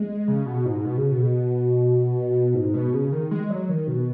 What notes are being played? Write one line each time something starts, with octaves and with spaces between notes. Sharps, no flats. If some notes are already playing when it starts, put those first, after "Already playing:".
Already playing: G#3
C#3
B2
G#2
B2
C#3
B2
G#2
B2
C#3
D#3
G#3
F#3
D#3
B2